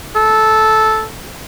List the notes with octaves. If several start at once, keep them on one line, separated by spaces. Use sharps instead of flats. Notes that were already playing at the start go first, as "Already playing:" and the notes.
A4